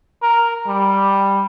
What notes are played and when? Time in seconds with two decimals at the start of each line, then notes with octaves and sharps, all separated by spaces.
0.22 A#4
0.67 G3